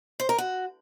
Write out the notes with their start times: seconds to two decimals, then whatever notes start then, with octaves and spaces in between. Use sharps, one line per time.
0.20 C5
0.29 A#4
0.38 F#4